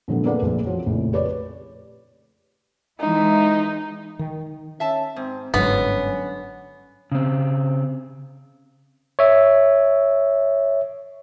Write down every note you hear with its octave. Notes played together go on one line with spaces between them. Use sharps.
A#2 D3 F3 G3 A3 B3
A#3 G#4 A4 B4 D5 F#5
A#1 A#2 F3
F3 C4 F#4 C#5
A#1 F2 A2 C#3
G4 B4 C#5 D5
E3 G#3 D#4 E4
D#3
C#4 E5 A5
G#2 C4
G1 G#2 D3 F#3 B3 C#4
C#3 C4
C#5 E5